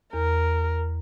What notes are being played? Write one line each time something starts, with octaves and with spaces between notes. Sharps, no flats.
E2 A#4